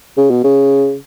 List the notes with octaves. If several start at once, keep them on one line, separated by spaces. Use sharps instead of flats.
C#3
B2
C#3